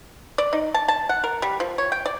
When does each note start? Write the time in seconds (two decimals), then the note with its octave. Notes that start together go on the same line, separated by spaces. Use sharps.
0.38 D5
0.53 D#4
0.74 A5
0.88 A5
1.09 F#5
1.24 A#4
1.42 G3
1.60 F3
1.78 C#5
1.92 G5
2.06 D5